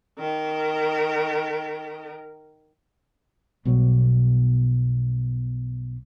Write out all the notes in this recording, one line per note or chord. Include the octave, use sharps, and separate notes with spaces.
D#3 A#4
B1 B2 F#3 G3